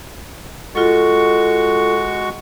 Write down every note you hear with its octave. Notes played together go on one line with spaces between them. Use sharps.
G#3 F4 F#4 A4 C#6